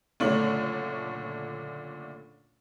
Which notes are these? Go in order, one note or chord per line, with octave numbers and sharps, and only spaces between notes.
F#1 A#2 D3 A3 C#5 F#7